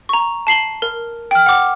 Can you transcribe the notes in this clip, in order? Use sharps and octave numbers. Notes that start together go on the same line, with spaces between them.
A#5 C#6
A5 C7 F#7 G7
A#4
G5 F6
F#5 D6